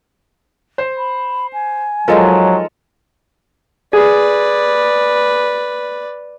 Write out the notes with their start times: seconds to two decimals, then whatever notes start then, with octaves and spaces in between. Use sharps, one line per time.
0.78 C5
0.98 B5
1.53 G#5
2.08 F3 F#3 G#3 D#4 F4 A4 A#4
3.93 G#4 B4 D5